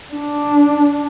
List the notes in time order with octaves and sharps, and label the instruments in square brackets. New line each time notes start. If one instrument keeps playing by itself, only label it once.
[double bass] D4